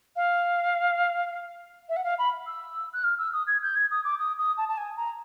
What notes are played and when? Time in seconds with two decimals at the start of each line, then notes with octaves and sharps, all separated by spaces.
0.16 F5
1.89 E5
1.96 F#5
2.04 F5
2.18 B5
2.46 E6
2.93 F#6
3.03 F6
3.18 E6
3.33 D#6
3.47 G#6
3.62 G6
3.76 G#6
3.90 D#6
4.04 D6
4.19 D#6
4.38 D#6
4.57 A5
4.68 A5
4.77 G#5
4.97 A#5